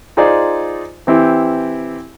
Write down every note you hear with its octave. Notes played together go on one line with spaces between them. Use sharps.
D#4 F4 G#4 C5 D5
E3 C4 E4 G4